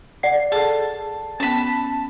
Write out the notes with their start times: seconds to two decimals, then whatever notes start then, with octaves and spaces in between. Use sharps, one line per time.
0.23 D5 F#5 C7
0.52 G#4 A4 A5
1.40 B3 C#4 A5 B5